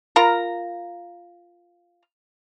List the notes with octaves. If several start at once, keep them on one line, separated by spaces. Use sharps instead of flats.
F4 A#4 A#5